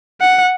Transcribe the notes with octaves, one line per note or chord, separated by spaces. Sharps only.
F#5